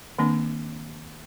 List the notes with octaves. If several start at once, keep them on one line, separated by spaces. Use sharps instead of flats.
D#3 A#3 C4 D4